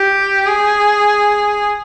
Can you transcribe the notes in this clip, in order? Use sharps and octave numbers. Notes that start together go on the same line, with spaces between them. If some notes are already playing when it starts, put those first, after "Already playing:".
Already playing: G4
G#4